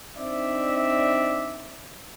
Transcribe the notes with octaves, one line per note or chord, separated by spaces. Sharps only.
C4 D4 D#4 D5 E5